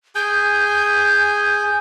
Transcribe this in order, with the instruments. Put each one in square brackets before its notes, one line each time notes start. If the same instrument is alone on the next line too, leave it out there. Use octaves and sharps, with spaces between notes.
[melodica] G#4 G#5 [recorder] G6